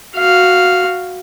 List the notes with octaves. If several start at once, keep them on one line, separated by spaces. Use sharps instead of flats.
F#4 F5